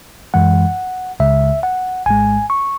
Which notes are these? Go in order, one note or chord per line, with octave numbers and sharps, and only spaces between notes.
F#2 E3 G#3 F#5
C#2 C#3 G#3 E5
F#5
G#1 G#2 G#3 G#5
C#6